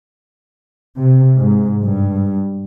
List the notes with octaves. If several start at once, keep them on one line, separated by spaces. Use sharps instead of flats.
C3
G#2
G2